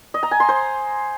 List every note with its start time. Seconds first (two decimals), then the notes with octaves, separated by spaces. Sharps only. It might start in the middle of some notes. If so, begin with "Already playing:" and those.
0.14 D#5
0.23 A#5
0.31 G#5
0.40 C6
0.49 C5